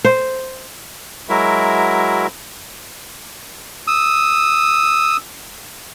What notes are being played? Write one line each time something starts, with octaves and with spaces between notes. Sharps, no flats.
C5
F#3 G#3 E4 F#4 A#4 E5
D#6 E6